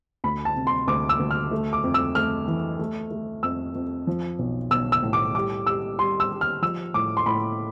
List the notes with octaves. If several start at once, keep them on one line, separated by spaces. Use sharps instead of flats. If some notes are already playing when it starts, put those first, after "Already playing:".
D2 B5
A5
C3
C6
D2 D6
E6
D2
F6
A3
D6
F2
E6
A3 F6
E3
A3
A3
F2 E6
F2
F3
B1
B1 E6
E6
A2
D6
G3 D6
G3 E6
G3 C6
E6
G3
F6
F3 E6
A2 D6
C6
A2 B5